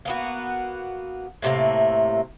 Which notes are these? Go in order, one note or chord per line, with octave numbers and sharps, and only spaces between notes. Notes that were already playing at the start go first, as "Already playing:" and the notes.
A#3 B3 F#4
A2 C3 A3 A#3